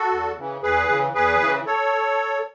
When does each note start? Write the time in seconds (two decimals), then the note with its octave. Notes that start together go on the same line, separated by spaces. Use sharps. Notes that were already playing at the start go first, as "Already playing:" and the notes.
Already playing: F#4 A4
0.11 E2
0.37 C#3 E3
0.63 E2 G#4 B4
0.89 C#3 E3
1.15 E2 G#4 B4
1.40 C#3 E3
1.66 A4 C#5